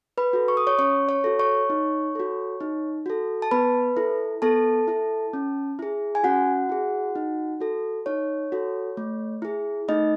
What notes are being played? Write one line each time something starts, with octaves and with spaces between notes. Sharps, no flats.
B4 B5
F#4 A4
C#6
D#6
C#5 C#6
C#4 C#5 C#6
C#5 C#6
F#4 A4
C#5 C#6
D#4
F#4 A4
D#4
F#4 A4
A5
B3 B4 B5
E4 A4
B3 A4 A5
E4 A4
C#4
E4 G#4
G#5
C#4 F#4 F#5
E4 G#4
D#4
F#4 A4
D#4 C#5
F#4 A4
A3
E4 G#4
A3 D#4 D#5